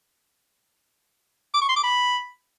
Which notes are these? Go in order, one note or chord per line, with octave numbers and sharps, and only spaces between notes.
D6
C#6
C6
D6
B5